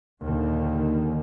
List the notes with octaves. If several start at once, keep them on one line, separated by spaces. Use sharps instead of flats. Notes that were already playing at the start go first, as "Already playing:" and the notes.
D#2 A#2 D3 D#3